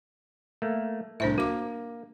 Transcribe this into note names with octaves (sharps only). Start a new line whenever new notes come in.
A3 A#3
C2 A2 D4 C5 E5
A#3 F#4 D6